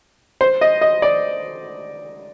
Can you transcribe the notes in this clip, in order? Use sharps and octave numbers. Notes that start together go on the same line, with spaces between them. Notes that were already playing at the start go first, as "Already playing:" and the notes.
C5
D#5
D#5
D5